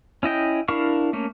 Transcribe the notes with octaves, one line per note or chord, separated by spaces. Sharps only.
C#4 E4 D#5 G5
D4 E4 A#4 F5 C#6
A3 A#3 C#4